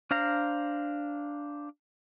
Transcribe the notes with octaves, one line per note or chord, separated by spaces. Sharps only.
D4 C5 F5 A#5